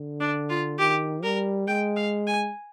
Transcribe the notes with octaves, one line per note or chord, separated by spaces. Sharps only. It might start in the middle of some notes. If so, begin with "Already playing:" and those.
Already playing: D3
D4
F4
D#3 G4
G3 A#4
G#3 G5
F5
G#5